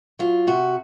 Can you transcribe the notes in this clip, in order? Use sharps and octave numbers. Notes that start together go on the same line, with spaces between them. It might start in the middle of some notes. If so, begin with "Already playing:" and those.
F#3 F4
C3 F#4